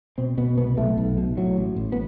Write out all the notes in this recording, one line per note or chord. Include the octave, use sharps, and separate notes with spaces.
B2 C4
B2 B3
C2 B3
B1 A3
B1
B2
A2 F#3
A1
A1
B3